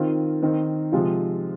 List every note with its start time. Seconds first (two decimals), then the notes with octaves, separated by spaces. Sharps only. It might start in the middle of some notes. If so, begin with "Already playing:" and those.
Already playing: D#3 C4 F4
0.42 D#3 C4 D#4 A#4
0.92 C3 F3 G#3 C4 F4